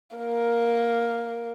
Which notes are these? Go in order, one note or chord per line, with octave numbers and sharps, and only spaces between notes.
A#3 A#4